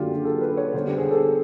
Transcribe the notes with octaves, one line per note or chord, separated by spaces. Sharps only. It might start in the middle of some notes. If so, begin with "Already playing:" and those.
Already playing: F#2 D3 F#3 A#3 D4 F4 G4
G#4
A4
B4
C#5
D3 G3 B3 C5
G4
G#4
A4